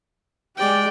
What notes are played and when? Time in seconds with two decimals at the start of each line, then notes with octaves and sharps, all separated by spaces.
0.57 G#3 G4 D5 G5